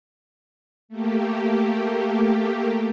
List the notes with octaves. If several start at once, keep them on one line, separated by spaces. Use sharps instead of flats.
A3 A#3 G4